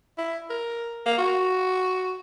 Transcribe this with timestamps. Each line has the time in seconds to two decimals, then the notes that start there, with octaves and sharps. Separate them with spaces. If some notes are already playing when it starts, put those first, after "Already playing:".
0.18 E4
0.50 A#4
1.06 A#3
1.18 F#4